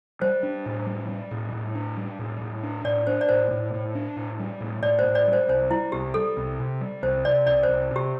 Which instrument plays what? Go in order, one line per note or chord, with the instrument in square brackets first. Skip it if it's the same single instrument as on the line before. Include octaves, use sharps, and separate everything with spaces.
[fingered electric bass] G3 [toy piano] C5
[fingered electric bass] D4
A2
G3
G3
A2
A2
D4
G3
A2
A2
D4
[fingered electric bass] A2 [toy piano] D5
[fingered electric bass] D4 [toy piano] C5
[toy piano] D5
[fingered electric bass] A2 [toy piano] C5
[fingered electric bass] A2
A2
D4
A2
G3
A2
[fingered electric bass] A2 [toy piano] D5
[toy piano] C5
[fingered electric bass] A2
[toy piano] D5
[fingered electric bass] G3
[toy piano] C5
[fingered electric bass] C2 [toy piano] C5
[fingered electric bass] G3 [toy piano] E4
[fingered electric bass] C2 [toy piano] G4
[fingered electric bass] G3 [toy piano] A4
[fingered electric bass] C2
C3
G3
[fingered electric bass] C2 [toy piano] C5
[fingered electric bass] C3 [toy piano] D5
[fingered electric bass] C2 [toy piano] D5
[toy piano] C5
[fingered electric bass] C2
[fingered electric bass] C3 [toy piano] G4